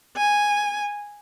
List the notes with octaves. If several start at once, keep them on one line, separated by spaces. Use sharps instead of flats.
G#5